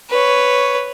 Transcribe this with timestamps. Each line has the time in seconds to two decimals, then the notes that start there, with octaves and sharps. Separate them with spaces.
0.10 B4 C#5